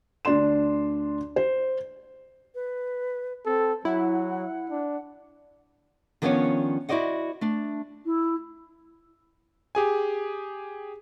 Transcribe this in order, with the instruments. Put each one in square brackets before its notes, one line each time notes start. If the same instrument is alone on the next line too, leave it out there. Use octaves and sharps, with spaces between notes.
[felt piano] D2 D4 D5 C6 E7
C5
[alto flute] B4
[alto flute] C4 [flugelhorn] A4
[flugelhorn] F#3 [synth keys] E4 [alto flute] F#5
[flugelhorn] D4
[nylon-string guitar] D#3 F3 B3 C#4 D4 C#5
E4 F#4 C5 D5 D#5 F#5
A3 D4
[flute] E4
[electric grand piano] G4 G#4 G#5